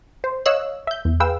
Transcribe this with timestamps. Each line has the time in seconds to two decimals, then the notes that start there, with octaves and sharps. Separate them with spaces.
0.24 C5
0.46 C#5 D#5 F5 E6 F#6
0.87 E5 G6
1.05 E2
1.20 G#4 B4 F5 G5 E6